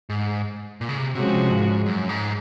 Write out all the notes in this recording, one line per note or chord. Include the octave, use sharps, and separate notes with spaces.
G#2
A#2
C#3
C3
C3 F3 G#3 C#4 F#4
G#2
F#2
G#2